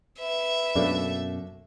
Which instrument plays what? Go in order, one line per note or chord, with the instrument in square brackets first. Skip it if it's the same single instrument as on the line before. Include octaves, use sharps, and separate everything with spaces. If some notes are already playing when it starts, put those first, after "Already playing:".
[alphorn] B4 [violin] E5
[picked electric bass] F#2 B2 [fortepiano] A3 A#3 D4